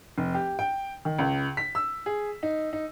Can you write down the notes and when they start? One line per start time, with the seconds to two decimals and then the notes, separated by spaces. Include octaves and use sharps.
0.18 F1
0.34 G4
0.59 G5
1.05 D#3
1.19 C#2
1.57 B6
1.75 E6
2.06 G#4
2.43 D#4
2.73 D#4